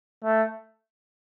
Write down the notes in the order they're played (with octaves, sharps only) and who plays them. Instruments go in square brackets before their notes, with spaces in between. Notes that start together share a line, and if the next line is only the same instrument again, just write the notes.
[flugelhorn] A3